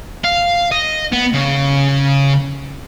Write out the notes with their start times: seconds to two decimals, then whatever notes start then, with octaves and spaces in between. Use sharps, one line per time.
0.24 F5
0.72 D#5
1.12 B3
1.33 C#3